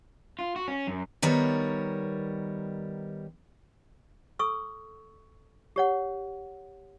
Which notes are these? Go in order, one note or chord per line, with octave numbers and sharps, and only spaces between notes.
F4
F#4
C#4
F#2
D#3 G3 B3 A#4 C#5
A4 C#6 E6
G4 C#5 F#5